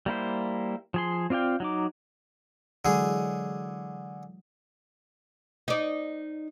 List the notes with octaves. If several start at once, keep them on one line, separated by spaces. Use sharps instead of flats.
G3 A#3 E4 C5
F3 G#4 C6
C4 F4 D5 F5 G5
F#3 D#4 D6
D3 E3 F#3 G#3 G#4
D#4 D5